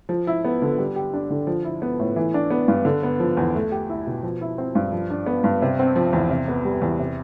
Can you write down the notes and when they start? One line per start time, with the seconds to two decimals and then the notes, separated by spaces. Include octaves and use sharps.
0.09 F3
0.27 E4
0.44 B3
0.62 D3
0.78 G3
0.96 G4
1.14 D4
1.30 D3
1.47 F3
1.64 E4
1.82 B3
1.99 A2
2.16 E3
2.34 D4
2.50 B3
2.68 G2
2.85 D3
3.03 B3
3.20 F3
3.37 E2
3.55 A3
3.72 G4
3.90 E4
4.07 B2
4.23 F3
4.41 E4
4.58 C4
4.75 G2
4.92 F3
5.10 D4
5.26 B3
5.44 G2
5.62 C3
5.79 C4
5.96 F3
6.13 E2
6.30 C3
6.48 B3
6.65 G3
6.82 E2
6.99 C3